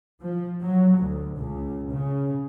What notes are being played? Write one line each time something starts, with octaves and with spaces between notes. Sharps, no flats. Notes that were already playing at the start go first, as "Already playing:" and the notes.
F3
F#3
D2
C#2
C#3